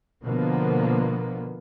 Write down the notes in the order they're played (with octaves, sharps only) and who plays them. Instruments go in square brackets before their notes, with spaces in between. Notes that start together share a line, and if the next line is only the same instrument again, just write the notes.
[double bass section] B2 D3 F3 A#3 B3